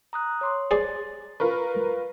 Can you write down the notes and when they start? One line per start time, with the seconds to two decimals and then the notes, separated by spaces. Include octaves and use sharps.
0.13 A#5 D#6 F#6
0.41 C#5 C6 D6
0.71 G#4 C5 D5 A6
1.40 F4 A#4 B4 C#6